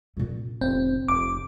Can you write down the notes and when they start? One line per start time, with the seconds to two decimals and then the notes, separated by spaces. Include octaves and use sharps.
0.17 A#2 C#4
0.61 F1 C4
1.08 F1 D6